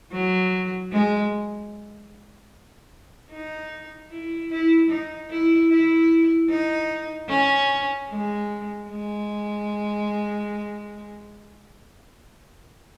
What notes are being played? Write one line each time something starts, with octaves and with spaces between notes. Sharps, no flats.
F#3
G#3
D#4
E4
E4
D#4
E4
E4
D#4
C#4
G#3
G#3